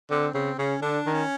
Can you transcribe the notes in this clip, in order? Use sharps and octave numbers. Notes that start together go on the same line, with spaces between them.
D3 C4
C#3 C4
C#3 C#4
D3 D4
D#3
C#4